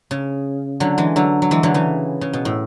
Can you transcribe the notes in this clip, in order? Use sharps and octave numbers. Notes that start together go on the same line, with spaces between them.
C#3
D3 F#3
E3 G#3
D3 F#3
F#3
E3 G#3
D3 F#3
C#3 E3
C#3
B2
A2